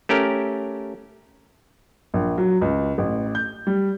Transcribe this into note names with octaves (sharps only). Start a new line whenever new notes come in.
A3 C#4 G4 A#4
A#1
F#3
C#2
A1
G6
G3